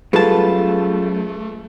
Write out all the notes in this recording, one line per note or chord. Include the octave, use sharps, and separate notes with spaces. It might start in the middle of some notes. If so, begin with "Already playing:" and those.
F#2 G3 A3 F4 G#4 A4 B4 A5